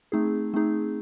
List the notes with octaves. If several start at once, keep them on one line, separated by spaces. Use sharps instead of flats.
A3 C4 D#4 G#4
A3 C4 D#4 G#4